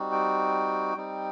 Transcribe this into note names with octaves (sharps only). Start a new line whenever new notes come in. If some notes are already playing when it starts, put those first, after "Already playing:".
Already playing: G3 C4 D#4 F#4
G5
G3 C4 D#4